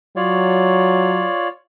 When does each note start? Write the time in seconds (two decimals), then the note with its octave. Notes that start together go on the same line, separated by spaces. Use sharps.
0.16 F#3 F4 C#5 D5